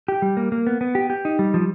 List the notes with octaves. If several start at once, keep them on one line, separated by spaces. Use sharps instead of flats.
G4
G3
A#3
A#3
B3
B3
G4
G4
D#4
G3
F3